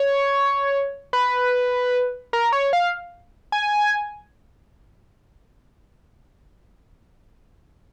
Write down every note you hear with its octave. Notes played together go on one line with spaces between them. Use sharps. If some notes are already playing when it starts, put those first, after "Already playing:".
Already playing: C#5
B4
A#4
C#5
F5
G#5